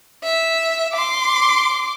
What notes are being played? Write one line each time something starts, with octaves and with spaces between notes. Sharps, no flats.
E5
C6 D6